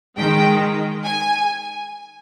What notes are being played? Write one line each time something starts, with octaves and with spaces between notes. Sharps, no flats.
D#3 G#3 G5
G#5